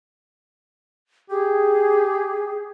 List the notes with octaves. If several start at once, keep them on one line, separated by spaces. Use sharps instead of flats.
G4 G#4